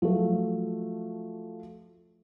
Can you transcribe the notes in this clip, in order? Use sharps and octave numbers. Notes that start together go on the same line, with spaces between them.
F3 F#3 A3